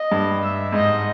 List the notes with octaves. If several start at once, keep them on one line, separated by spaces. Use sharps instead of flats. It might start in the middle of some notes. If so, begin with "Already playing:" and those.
Already playing: D#5
G2
E5
G#2 D#5